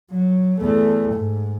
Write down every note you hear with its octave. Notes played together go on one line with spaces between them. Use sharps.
F#3
E2 A3
G#2